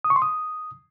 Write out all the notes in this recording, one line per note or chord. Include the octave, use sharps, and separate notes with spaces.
D#6
C#6
C6
D#6